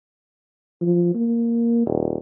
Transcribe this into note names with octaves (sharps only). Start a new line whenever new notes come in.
F3
A#3
D#1